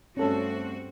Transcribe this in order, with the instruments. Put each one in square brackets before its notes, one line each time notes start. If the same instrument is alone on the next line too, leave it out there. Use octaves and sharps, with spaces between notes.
[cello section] G2 C4 F#4 [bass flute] A3 [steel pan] C#4 A4